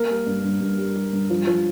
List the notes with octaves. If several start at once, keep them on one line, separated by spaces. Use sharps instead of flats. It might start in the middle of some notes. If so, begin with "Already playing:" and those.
Already playing: A#3 A#4
G3
G2
G2
G2
G3
G3
G2
F3
F3